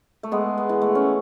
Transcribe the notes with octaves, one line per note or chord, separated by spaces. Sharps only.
A3
G#3 B3
B3
E3
A3
C#4